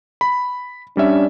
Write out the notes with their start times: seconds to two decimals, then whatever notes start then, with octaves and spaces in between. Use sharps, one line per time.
0.21 B5
0.97 G3 C#4 D4 E5